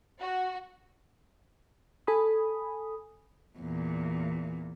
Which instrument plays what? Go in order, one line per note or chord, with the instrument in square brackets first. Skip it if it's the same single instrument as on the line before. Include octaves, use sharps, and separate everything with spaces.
[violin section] F#4
[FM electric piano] A4 G#5 B5 D#6
[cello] E2 A#2